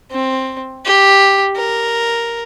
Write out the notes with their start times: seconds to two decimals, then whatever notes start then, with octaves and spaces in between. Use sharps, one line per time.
0.11 C4
0.85 G4
1.56 A#4